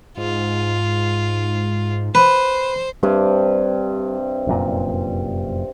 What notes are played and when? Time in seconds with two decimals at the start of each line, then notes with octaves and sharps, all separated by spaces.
0.18 G#2 F4
2.15 B4 C5
3.03 G2 C3 G3
4.47 F1 F#2 A#2